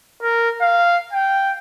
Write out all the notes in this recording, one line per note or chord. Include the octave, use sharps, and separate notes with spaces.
A#4
F5
G5